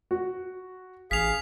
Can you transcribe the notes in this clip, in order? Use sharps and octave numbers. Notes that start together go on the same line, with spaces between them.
F#4
A1 G#4 F5 B6 F7